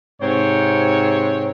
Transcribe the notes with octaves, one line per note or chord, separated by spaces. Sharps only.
G#2 C3 C4 C#5